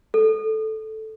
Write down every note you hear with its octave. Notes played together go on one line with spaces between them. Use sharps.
A4